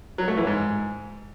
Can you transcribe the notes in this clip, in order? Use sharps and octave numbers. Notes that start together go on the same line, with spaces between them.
F#3
A3
E3
G#2